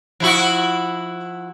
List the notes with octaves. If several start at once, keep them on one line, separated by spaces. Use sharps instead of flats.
F3 E4 F#4